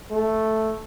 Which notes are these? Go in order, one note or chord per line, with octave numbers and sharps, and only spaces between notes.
A3